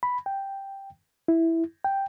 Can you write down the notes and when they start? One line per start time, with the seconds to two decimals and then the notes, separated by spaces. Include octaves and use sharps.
0.03 B5
0.26 G5
1.28 E4
1.85 G5